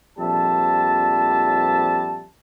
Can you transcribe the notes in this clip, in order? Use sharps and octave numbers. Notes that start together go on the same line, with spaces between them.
A#1 F2 G3 E5 A5